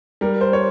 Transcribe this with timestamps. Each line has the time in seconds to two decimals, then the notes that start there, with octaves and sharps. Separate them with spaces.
0.21 G3 A#4
0.41 C5
0.53 C#5